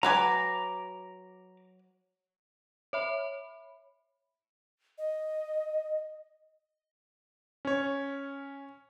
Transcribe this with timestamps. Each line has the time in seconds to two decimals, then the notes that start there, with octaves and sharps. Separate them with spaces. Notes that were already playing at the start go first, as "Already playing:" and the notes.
0.03 F#3 B4 G#5 A#5 D6
2.93 C#5 E5 B5
4.98 D#5
7.65 C#4 C#5